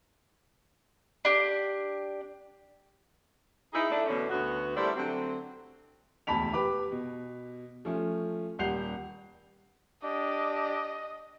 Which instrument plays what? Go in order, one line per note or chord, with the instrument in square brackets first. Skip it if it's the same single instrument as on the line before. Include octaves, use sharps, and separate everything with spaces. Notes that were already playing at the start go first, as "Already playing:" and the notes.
[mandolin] D4 G4
[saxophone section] D#4 E4 G#4
A3 D4 E4
D2 B2 D3 E3 C#4
D2 B3 F#4
G3 A3 D4 E4 A#4 C5
D3 F#3 A3 C4
[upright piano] E1 D2 A5 B5 B6 F7
G4 B4 B5 D6
B2
F3 A3 C#4
D#1 G3 F#5 G6 C7 F7
[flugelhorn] D4 [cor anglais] G4 [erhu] D#5